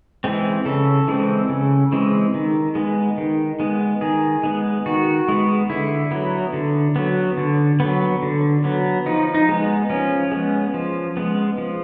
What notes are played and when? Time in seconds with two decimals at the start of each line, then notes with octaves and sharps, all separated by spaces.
0.24 E3 G#3 C4
0.65 C#3 A4
1.08 E3 G#3 C4
1.49 C#3
1.92 E3 G#3 C4
2.34 D#3
2.75 G#3 B3
3.18 D#3
3.60 G#3 B3
4.01 D#3 G#4
4.43 G#3 B3
4.86 D#3 F#4
5.29 G#3 B3
5.70 D3 E4
6.11 F#3 B3
6.53 D3
6.96 F#3 B3
7.37 D3
7.80 B3
7.85 F#3
8.23 D3
8.64 F#3 B3
9.06 F3 D#4
9.34 D#4
9.49 G#3 B3
9.90 F3 C#4
10.32 G#3 B3
10.74 F3
11.17 G#3 B3
11.58 F3